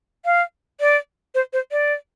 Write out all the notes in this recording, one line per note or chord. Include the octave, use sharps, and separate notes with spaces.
F5
D5
C5
C5
D5